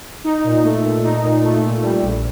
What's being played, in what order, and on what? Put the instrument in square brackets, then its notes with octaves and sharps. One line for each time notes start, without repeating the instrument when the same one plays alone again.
[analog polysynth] D#4
A#2
A3
A#2
D#4
A#2
A3
A#2
G3
A#1